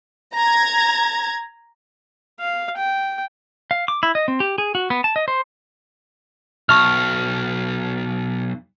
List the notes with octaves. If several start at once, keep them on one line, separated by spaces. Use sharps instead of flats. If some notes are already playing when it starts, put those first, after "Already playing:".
A#5 G#6
F5
G5
F5
D6
E4
D#5
C4
G4
G#4
F#4
B3
A5
D#5
C5
B1 E5 A5 C#6 F6